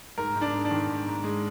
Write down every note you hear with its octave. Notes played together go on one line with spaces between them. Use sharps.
G#2 A#4
G#2
D4
G#3
D4
D#3
G#2
G#2
G#3